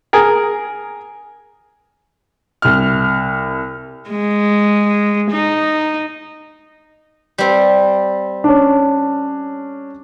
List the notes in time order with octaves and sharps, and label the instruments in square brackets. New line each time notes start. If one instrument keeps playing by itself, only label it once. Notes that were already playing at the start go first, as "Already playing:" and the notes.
[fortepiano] G#4 A#4
[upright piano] C2 F6
[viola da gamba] G#3
D#4
[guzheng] G3 C4
[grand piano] C#4 D4